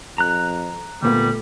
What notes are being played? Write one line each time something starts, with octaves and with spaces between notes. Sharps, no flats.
F2 A#5 F#6
D2 A#2 G3 A3 B3